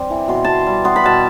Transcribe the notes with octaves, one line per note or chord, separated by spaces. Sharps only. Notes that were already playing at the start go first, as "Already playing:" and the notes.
Already playing: G3 C4 D5
E3
B2 C6
B2 A5 C6
G3
B3 C6
B5
B2 A5